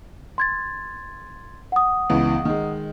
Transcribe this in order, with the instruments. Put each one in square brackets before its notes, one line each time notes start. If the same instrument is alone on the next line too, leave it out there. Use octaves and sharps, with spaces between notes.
[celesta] C6 G#6 A6
F#5 D#6
[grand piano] C#2 E3 B3
D#3 G#3